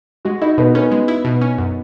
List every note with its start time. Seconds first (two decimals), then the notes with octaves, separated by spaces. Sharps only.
0.25 G#3 F#4
0.41 D#4 E4
0.58 B2 B3
0.75 B3 C#4
0.91 G#3
1.08 E4
1.25 B2
1.41 C#4
1.58 F#2